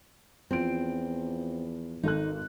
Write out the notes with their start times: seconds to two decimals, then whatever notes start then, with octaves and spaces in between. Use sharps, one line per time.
0.51 E2 F3 C4 D7
2.03 G#1 D#4 A4 F#6